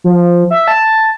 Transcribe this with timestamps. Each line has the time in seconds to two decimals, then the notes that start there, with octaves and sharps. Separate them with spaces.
0.04 F3
0.50 E5
0.68 A5